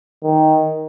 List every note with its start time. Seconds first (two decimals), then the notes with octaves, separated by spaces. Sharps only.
0.23 D#3